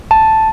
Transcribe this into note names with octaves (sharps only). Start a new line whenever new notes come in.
A5